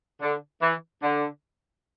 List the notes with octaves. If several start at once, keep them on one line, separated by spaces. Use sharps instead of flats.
D3
E3
D3